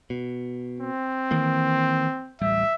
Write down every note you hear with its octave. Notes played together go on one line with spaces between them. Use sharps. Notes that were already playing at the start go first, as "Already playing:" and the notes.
B2
C4
D#3 E3 A#3
D1 A1 G3 E5